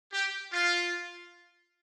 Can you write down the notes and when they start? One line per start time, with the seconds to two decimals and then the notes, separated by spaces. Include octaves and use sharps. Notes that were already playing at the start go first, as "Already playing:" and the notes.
0.13 G4
0.53 F4